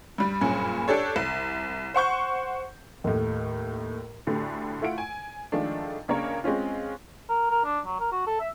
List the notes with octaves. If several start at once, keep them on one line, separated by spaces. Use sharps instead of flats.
G2 G3
F#1 G2 A#2 C#4
D4 G4 A4 C#5
C2
C5 F#5 C#6 G6
D#2 A2
D2 A2 D3 A3 G4
A3 E4 F4 F#5 D7
G#5
D#3 F3 G#3 A3 D4
C#2 C#3 A#3 D4 A#4 C#5
G#3 C4 C#4 F4
A#4
A#4
D4
F#3
A#4
F#4
A4
E5